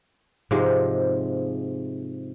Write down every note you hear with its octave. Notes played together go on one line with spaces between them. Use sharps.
G#2 C3 F3 G#3